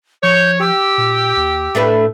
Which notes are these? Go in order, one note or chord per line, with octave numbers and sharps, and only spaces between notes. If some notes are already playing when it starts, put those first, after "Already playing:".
F3 C#5 G6
G4 E6
A#2
D#2
A2 A3 D4 B4